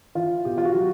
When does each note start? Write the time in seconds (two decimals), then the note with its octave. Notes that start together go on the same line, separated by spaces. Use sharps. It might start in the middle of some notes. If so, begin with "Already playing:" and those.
0.15 E3 F4
0.45 B2 G4
0.58 F4
0.65 F#4
0.75 F#3